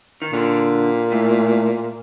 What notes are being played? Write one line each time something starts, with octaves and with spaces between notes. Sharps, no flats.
D#3
A#2 D3
A2